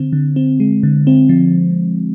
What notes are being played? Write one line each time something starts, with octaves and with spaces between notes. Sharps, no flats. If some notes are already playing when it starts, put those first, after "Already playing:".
Already playing: D3 C4
D3
C4
G#3
D3
C4
F3